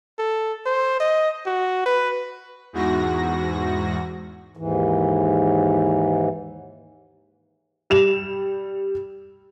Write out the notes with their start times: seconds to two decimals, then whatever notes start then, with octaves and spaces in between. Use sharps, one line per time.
0.19 A4
0.66 C5
1.00 D#5
1.46 F#4
1.86 B4
2.73 E2 G#2 F#4 A#6
4.57 D#2 G#2 E3
7.90 G3 E7 F7